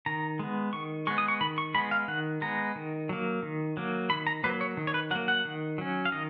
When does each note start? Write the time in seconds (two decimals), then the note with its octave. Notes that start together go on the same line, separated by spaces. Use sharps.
0.06 D#3 A#5
0.39 G#3 B3
0.73 D#3 C#6
1.07 G#3 B3 C#6
1.18 D#6
1.28 C#6
1.41 D#3 B5
1.58 C#6
1.75 G#3 B5
1.78 B3
1.91 F5
2.08 D#3 F#5
2.41 G#3 B3 A#5
2.75 D#3
3.09 F#3 A#3
3.43 D#3
3.77 F#3 A#3
4.10 D#3 B5
4.27 A#5
4.44 F#3 A#3 B4
4.61 C#5
4.77 D#3
4.87 C#5
4.94 B4
5.11 F#3 F#5
5.15 A#3
5.28 F#5
5.45 D#3
5.78 F#3 C#4
6.05 F5
6.12 D#3 D#5